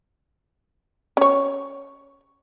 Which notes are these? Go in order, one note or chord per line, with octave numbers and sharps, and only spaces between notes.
C#4 C#5